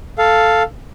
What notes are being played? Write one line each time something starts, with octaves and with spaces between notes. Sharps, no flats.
A4 F5